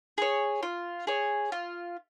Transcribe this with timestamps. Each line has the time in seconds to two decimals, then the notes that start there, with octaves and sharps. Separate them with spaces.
0.18 G#4 C#5
0.63 F4
1.07 G#4 C#5
1.52 F4